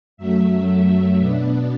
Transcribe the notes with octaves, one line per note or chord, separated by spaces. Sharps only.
F#2 F#3 A3 E5
B2 B3 D4